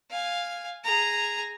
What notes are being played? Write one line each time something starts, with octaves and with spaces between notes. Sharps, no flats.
F5 G#5
G#4 A#5